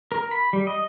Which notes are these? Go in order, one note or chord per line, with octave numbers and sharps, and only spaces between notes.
A#4
B5
G3
D#5